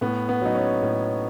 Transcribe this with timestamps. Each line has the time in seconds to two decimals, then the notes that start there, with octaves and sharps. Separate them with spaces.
0.01 A2 B3
0.29 B3
0.42 F#3 D#4
0.55 C#4
0.83 A2